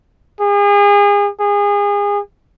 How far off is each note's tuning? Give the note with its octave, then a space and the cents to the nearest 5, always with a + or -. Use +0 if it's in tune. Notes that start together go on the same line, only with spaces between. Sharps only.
G#4 -35
G#4 -30